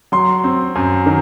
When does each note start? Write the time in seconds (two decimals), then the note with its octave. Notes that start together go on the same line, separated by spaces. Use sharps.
0.12 F#3 C6
0.44 C4
0.75 F#2
1.06 D#3